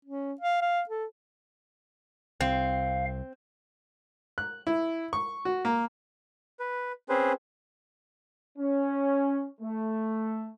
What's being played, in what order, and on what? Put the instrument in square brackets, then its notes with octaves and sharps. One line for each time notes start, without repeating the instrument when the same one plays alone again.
[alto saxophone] C#4
F5
F5
A4
[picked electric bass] C2 [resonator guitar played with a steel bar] C4 [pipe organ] F5
[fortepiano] F#6
E4
C#6
F#4
A#3
[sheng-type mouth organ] B4
C4 C#4 G#4 B4 C5
[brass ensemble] C#4
A3